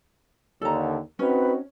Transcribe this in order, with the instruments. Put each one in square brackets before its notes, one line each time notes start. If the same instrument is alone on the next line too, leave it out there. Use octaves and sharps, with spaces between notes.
[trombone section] D#2 D3 [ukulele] A4 A#5
[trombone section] C4 D#4 F#4 [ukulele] C#4 [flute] B4